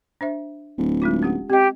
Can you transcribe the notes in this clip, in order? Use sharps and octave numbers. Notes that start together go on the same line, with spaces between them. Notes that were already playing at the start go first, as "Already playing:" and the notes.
D4 C5 E5
D1
G#3 D#4 F4
C#4 G4 F#5
C4 G4 D#5